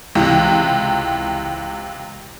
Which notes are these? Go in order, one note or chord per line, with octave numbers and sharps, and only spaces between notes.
C#2 C3 E3